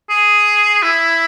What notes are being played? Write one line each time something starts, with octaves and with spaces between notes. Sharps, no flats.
G#4
E4